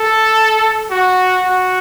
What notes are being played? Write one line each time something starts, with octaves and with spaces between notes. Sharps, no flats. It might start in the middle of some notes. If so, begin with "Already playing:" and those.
Already playing: A4
F#4
F#4